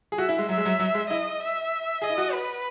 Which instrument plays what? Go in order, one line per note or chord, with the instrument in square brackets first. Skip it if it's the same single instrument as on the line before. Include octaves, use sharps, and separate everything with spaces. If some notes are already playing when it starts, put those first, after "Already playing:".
[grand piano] G#4
[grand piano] F#4 [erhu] E5
[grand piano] E4
G#3
[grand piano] F#3 [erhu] E5
[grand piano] G#3
F#3
F#3
G#3
[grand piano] E4 [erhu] D#5
[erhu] E5
[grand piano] G#4 [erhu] D#5
[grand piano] E4
F#4
[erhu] B4